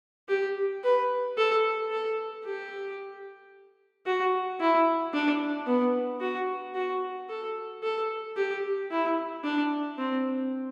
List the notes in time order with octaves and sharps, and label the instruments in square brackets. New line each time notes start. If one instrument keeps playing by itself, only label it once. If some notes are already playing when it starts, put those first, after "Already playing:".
[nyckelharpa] G4
B4
A4
A4
G4
F#4
E4
D4
B3
F#4
F#4
A4
A4
G4
E4
D4
C4